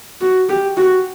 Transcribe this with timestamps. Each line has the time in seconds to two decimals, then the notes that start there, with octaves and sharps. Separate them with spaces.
0.21 F#4
0.49 G4
0.77 F#4